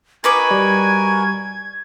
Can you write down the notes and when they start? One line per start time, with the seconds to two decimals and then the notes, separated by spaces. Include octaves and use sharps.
0.24 D#4 F#4 A#4 B4 G#5 D6 G#6
0.51 G3